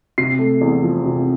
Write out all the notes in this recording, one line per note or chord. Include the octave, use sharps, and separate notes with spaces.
C3 C7
A3
E2
F3
C3